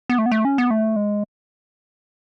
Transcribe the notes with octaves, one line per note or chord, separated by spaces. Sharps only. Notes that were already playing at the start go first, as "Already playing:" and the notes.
B3
A3
B3
A3
C#4
B3
A3
G#3